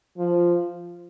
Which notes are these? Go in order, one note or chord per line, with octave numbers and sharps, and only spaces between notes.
F3